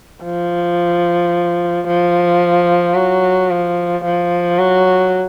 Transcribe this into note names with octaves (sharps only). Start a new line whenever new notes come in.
F3
F3
F#3
F3
F3
F#3